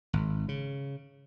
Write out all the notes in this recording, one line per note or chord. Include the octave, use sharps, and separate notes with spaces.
G#1
C#3